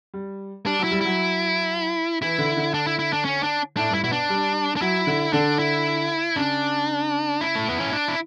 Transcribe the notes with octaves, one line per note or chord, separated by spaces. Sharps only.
G3
G3 D4
F#3
E4
G3
F#3 E4
E3 E4
D3
D3
D4
E4
E4
D4
C#4
D4
A2 D4
G2 E4
B2 E4
D4
G3
D4
F#3 E4
D3
D3 D4
E4
C#3 D4
E4
A3
B3
C#4
D4
E4